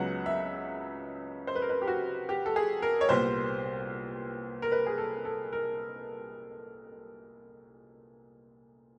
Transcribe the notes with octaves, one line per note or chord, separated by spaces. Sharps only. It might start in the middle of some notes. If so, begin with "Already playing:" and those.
Already playing: C#2 C#3 F#3 B3 F#5
E5
C5
B4
A#4
B4
G4
F#4
G4
A4
G#4
A#4
C#5
C2 A#2 G3 B3 C5
A#4
B4
G#4
A4
A4
A#4